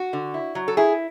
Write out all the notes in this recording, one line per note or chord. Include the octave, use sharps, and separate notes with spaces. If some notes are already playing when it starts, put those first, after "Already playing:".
Already playing: F#4
D3
E4
F#3
A4
E4 G#4